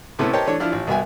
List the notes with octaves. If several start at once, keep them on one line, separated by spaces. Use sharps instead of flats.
A2 C3 B3 C#4 E4 A4
G4 A#4 C5 C#5 D#5 A5
E3 A3 D4 C#5
F3 D4 E4 F4 F6
A1
C2 B2 B4 E5 G5 G#5